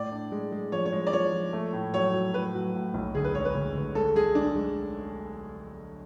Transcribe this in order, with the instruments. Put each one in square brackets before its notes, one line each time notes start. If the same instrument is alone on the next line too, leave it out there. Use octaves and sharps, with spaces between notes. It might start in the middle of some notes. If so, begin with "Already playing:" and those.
Already playing: [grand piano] A2 [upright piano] D5
[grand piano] D4
G#3
G#3
[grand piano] F3 [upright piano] C#5
[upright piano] C#5
[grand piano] G#3
[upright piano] D5
[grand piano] F3 [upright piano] C#5
[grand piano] F3
A3
A2
[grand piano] F#3 [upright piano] C#5
[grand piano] F#3
[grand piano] A2 [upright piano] B4
[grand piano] F#3
A2
B1
[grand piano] D2 [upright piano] G#4
[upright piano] B4
[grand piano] G#3 [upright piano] C#5
[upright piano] B4
[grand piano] D2
D2
[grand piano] G#3 [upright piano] A4
[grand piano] G#3 [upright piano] G#4
[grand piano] G#3 [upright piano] D4
[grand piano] G#3